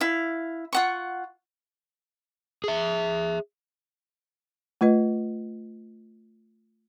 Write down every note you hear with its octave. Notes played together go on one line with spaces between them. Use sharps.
E4 F5
F4 F#5 C#6
G#4 E5
A3 F4 B4 D#5